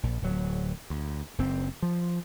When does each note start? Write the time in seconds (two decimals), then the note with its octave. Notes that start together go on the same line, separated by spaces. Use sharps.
0.03 A#1
0.22 D1 F#3
0.90 D2
1.38 F#1 C4
1.82 F3